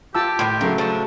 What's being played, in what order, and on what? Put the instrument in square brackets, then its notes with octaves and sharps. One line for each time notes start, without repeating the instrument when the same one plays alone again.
[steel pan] F4 A5 E6 [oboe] G4
[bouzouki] A2 D#3 [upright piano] C6
[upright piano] C#3 F#3 A3 [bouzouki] A#3
[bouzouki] F3 D4 [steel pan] A5 C#6